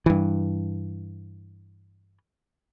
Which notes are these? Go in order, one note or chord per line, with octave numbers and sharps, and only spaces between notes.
G2 E3